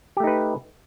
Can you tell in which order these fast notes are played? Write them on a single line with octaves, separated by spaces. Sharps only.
G4 A3 D#4 B4